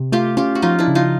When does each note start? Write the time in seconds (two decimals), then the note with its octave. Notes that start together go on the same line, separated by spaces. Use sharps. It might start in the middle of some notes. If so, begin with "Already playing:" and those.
Already playing: C3
0.12 A3 F4 G4
0.37 C#4 F4 G4
0.55 F#4
0.62 F3 D#4 F4
0.79 D4 E4
0.88 C#3
0.95 D#4 F4